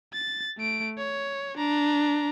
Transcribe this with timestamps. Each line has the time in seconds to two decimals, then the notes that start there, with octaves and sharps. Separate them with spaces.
0.14 A6
0.58 A3 D7
0.98 C#5
1.58 D4 A#5